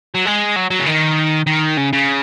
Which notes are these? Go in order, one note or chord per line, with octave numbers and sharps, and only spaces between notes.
F#3
G#3
F#3
F#3
C#3
D#3
D#3
C#3
C#3